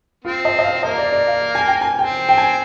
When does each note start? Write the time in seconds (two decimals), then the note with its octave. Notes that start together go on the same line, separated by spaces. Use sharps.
0.25 C4 F4
0.45 D#5
0.59 D#5
0.64 F5
0.83 A#3 D#5
0.98 D5
1.13 D5
1.27 F5
1.55 G#5
1.67 G5
1.81 G#5
1.99 C4 G5
2.29 G5
2.38 G#5